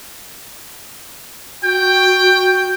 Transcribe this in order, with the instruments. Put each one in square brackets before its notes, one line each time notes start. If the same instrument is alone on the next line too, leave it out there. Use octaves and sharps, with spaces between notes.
[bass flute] F#4 [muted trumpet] G5